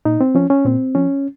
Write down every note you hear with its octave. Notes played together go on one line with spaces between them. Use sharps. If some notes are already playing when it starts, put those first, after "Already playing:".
A#2 D#4
C4
F3 C#4
C#4
A#2 C4
F3 C#4